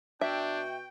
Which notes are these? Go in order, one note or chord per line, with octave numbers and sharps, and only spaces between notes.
B2 D4 F#4 E5 G5